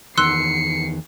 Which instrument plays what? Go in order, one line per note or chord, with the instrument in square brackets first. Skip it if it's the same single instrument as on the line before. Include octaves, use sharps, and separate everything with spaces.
[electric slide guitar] E2 D#3 B3 [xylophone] C6 E6 F#6 [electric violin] C7 C#7